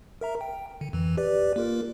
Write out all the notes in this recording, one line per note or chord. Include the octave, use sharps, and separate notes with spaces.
A#4 E5 A#5
G5
D3
F2 E3
G4 B4 D5
A#3 F4 A#4